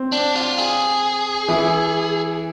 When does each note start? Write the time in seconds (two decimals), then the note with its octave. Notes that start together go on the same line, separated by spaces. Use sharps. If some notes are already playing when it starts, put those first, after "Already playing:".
Already playing: C4
0.12 D4
0.35 F4
0.58 G#4
1.48 E3 E4